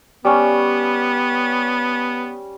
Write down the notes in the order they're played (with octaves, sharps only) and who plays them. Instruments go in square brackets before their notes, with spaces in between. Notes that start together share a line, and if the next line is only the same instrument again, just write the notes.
[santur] G3 C#4 [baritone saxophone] B3